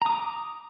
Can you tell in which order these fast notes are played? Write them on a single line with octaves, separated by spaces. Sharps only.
A#5 D#6 D6